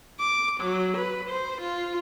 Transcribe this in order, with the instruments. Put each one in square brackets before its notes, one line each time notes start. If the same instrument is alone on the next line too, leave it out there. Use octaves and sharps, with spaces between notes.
[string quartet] D6
F#3
B4
C5
F4